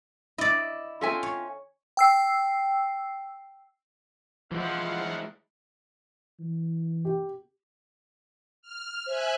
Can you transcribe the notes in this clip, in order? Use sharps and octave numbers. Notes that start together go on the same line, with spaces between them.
E4 D5 D#5
C4 C#4 F4 A4 E5 G#5
C#5
G5 E6 C7
E3 F3 G#3 E4 F5 F#5
E3
G4
F6
C5 E5 G#5 F#6